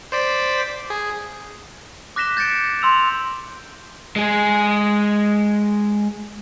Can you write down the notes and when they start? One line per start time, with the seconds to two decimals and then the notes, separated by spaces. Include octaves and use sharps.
0.12 C5 D5 B6
0.90 G#4
2.16 D6 F#6 A#6 B6 E7 G7
2.37 G6 A6 B6 C#7 D7
2.82 C6 E6 F7
4.16 G#3 G#4